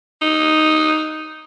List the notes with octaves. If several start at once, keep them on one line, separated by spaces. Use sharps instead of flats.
D#4